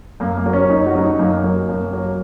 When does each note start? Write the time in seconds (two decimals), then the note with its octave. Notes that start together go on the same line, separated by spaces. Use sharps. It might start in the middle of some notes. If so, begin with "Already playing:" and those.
0.20 F#2 A#3
0.37 A#3
0.46 F#3
0.53 C#4
0.70 F#2 D#4
0.86 F#4
0.95 F#3 C#4
1.03 D#4
1.19 F#2 A#3
1.43 F#3
1.69 F#2
1.93 F#3